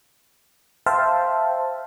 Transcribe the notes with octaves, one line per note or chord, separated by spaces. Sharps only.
C5 E5 F5 G5 A5